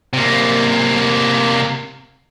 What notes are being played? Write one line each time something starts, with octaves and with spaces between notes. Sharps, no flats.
C3 A#3